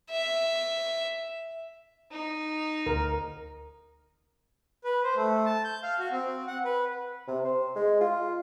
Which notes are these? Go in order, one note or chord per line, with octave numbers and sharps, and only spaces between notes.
E5
D#4
D2 A#4
B4
C5
A3
A5
G6
F5
F#4
C4
F#5
B4
C3
C5
G#3
F4